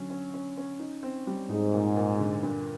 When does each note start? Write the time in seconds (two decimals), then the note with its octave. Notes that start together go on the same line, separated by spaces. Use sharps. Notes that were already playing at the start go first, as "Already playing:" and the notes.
Already playing: D3 F#3 C#4
0.10 C#4
0.34 C#4
0.57 C#4
0.79 D#4
1.03 C4
1.27 G3
1.49 G#2 D#4
1.74 A#2
1.96 A#2
2.20 D3
2.43 G2